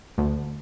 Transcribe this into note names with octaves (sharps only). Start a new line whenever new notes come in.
D2